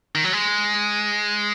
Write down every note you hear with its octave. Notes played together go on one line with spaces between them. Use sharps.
D#3
F#3
G#3